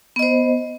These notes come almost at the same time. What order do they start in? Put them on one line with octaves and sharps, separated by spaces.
B3 D#5 C5